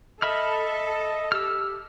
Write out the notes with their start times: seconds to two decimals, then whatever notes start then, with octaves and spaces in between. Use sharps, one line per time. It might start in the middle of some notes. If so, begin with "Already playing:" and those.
0.22 A4 D#5 E5 B5 F6
1.32 G4 E6 F6